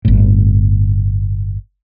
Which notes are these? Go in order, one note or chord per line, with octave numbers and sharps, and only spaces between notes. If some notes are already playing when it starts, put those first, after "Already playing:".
G1 A2